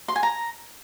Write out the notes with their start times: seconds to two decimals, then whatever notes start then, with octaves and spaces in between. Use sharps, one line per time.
0.08 C6
0.16 G#5
0.23 A#5